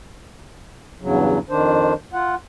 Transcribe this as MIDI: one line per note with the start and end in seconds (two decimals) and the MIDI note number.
1.01 1.39 40
1.01 1.39 43
1.01 1.39 49
1.01 1.39 54
1.50 1.93 41
1.50 1.93 51
1.50 1.93 62
1.50 1.93 72
2.13 2.35 65
2.13 2.35 78